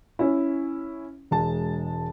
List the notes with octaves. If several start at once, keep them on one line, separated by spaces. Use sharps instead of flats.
C#4 E4
E1 G#3 A5